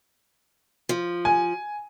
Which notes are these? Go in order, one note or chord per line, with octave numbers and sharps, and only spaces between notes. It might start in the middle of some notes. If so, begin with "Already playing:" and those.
F3
G#5